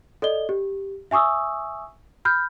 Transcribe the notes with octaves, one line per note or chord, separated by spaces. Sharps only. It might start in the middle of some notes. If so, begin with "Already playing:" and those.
A4 D5 D#5 G7
G4
E5 G#5 C#6 D#6 E6
B5 F6 G6